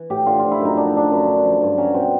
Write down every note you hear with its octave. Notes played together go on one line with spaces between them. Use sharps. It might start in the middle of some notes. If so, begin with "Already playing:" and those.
Already playing: E3
A2 G4
D3 F4
F3 F4
E4
F#2 D#4
D3 D4
D#4
F3 D4
F#2
D3
F3
G2
F#3 C#4
B2 C4